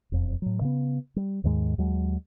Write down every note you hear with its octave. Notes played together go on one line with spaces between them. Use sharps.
E1 F2
A2 F#3
C#3 A#3 B3
G3
D#2 G#2 D#3 G#3
D#2 F#3 G#3